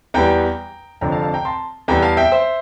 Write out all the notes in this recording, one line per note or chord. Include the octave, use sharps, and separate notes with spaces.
E2 E3 G3 G5 A#5
F1 F2 D3 F3 G5 A#5
F5 A5
F5 A5
G5 A#5
A5 C6
E2 E3 G3 G5 A#5
F5 A5
E5 G5
C5 E5